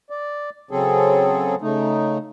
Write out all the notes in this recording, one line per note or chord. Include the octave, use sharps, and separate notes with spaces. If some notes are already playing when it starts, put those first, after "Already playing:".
D5
C#3 F#3 C4 G#4 A4
C#3 A3 D#4